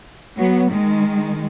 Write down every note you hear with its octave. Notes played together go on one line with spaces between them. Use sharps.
F#3 B3
D#3 G#3